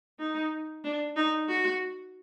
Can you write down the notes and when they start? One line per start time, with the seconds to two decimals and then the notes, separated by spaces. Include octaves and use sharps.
0.20 D#4
0.84 D4
1.16 D#4
1.49 F#4